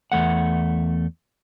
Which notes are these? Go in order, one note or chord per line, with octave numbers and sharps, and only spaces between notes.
E2 A3 F#5